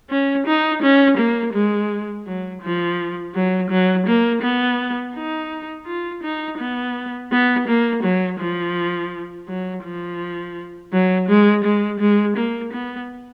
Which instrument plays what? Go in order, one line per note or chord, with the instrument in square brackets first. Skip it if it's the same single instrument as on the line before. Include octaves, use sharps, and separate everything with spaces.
[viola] C#4
D#4
C#4
A#3
G#3
F#3
F3
F#3
F#3
A#3
B3
D#4
F4
D#4
B3
B3
A#3
F#3
F3
F#3
F3
F#3
G#3
G#3
G#3
A#3
B3